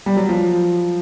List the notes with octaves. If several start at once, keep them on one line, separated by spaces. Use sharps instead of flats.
G3
F#3
F3